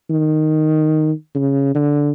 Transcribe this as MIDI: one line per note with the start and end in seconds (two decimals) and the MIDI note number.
0.10 1.12 51
1.35 1.74 49
1.75 2.12 50